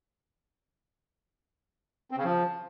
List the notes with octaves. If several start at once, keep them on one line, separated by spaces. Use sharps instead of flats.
C4
C#3
F3